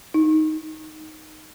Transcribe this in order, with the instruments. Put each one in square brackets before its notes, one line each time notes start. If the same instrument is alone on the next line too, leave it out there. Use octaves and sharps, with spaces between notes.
[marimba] D#4